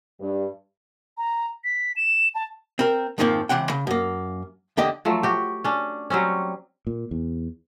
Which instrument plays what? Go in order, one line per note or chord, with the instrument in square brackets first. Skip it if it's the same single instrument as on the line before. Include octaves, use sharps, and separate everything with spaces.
[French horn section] G2
[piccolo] A#5
B6
E7
A5
[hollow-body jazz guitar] C4 A#4
F2 G#2 D#3 F3 A#3 C4
C#2 E3 C4 F#5 G5
C#3
F#2 A#3
E2 D3 G4 D#5
[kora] F3 F#3 A3
F#4 G4
C#4 D4
F#3 G3 C4 C#4
[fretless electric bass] A#2
E2